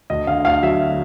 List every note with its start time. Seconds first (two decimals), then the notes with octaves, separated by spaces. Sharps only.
0.10 D2 D#5
0.27 D3 F5
0.45 D2 F5
0.63 F#3 E5